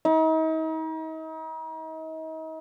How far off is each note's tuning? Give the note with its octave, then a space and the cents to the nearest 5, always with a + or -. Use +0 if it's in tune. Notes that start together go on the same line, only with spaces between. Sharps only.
D#4 +40